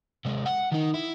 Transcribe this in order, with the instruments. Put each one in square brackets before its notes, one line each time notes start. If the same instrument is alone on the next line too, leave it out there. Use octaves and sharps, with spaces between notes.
[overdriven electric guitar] C3 G#3
F#5
D#3 D#4
E4